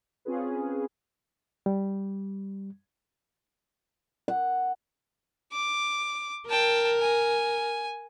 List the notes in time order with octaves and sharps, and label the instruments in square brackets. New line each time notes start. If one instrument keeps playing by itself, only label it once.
[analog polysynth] C4 C#4 F4 G#4 B4
[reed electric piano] G3
[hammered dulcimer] F#5
[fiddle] D6
[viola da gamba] A#4 [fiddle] G5 A5
[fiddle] G#5